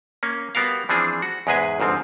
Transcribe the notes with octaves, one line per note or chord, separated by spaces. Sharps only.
A#3 C#4
G3 B3 F#4 A#4 F5
E3 F3 C4 D4 G#4
F#4
E2 G#2 G#3 G#4 B4 G#5
G1 G#2 F3 C4